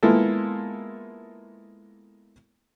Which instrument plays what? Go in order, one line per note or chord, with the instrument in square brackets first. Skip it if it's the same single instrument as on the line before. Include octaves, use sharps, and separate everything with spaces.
[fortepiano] G#3 A#3 B3 E4 F4 A4